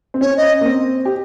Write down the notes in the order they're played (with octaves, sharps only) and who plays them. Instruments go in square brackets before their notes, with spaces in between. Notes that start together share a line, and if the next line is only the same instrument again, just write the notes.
[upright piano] C4
[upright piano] C#4 [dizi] C#5
[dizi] D#5
[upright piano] A#3
C4
G4